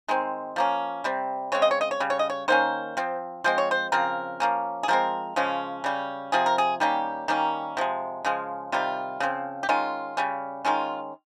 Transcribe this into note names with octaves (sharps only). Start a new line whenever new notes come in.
D#3 G#3 C4
F3 A#3 C#4
C3 G3 C4
C#3 G#3 C4 C#5
D#5
C#5
D#5
C#5
C#3 G3
C#5
D#5
C#5
D#3 A#3 C#4 C5
F3 C4
F3 G#3 C4 C5
C#5
C5
C#3 F3 C4 A#4
F3 A#3 C#4
G#4
F3 G#3 C4 A#4
C#3 F3 G#3 C#4
C#3 G3 C#4
C3 F3 C4 G#4
A#4
G#4
D#3 G3 A#3 C#4 G4
D#3 G3 A#3 C#4
C3 F3 G#3
C#3 F3 G#3
C3 D#3 G3 F4
C#3 F3 C4
G4
D#3 G#3 C#4 F4
C#3 G3 C#4
D#3 G#3 C#4 F4